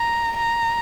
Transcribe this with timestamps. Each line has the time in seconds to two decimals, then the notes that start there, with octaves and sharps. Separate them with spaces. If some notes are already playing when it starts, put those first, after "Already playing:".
Already playing: A#5
0.37 A#5